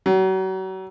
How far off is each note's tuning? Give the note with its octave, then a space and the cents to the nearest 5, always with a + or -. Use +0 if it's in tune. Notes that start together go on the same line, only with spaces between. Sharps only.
F#3 +35